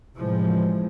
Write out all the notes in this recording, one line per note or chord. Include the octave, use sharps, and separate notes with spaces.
A2 C3 E3 F3 G#3